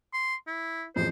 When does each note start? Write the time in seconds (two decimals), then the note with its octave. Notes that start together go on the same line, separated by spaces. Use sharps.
0.13 C6
0.47 E4
0.96 E1 A1 F2 C5